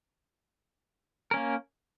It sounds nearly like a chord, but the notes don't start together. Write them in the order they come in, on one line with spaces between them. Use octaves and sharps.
A#4 C#4 A#3